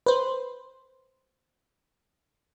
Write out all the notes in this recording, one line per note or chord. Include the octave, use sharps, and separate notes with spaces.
B4 C5